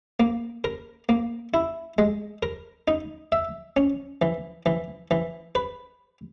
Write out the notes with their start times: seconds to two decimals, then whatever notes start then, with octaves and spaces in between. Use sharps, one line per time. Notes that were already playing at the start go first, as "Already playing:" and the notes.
0.20 A#3
0.64 A#4
1.09 A#3
1.54 E4
1.98 G#3
2.43 A#4
2.88 D#4
3.32 E5
3.77 C#4
4.22 E3
4.66 E3
5.11 E3
5.55 B4